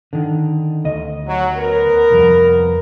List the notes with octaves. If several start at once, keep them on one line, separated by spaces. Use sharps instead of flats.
D3 D#3
D2 D#5
F#3
B3 A#4
C2 F2